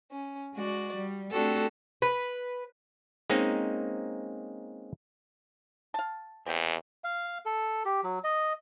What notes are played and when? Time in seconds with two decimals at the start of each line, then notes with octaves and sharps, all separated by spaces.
0.10 C#4
0.54 G#3 F#4 D5
0.96 G3
1.31 A3 C4 D4 F#4 G4 A4
2.02 B4
3.30 G#3 A#3 C4 C#4 D#4
5.94 F5 A5
6.46 E2 C4 G4 G5
7.04 F5
7.46 A4
7.85 G4
8.04 F#3
8.24 D#5